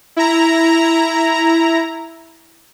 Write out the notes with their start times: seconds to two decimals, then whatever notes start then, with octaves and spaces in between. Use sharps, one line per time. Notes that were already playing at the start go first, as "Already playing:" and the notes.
0.17 E4 A#5